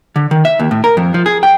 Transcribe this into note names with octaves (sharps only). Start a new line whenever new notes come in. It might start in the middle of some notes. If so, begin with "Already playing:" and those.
D3
D#3
E5
D#2
A2
A#4
F2
F3
G#4
G5